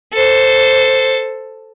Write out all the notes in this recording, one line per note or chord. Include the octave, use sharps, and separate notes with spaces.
A4 C5